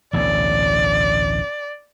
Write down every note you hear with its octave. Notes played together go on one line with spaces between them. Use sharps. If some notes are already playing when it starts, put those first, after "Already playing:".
A1 D2 B2 D5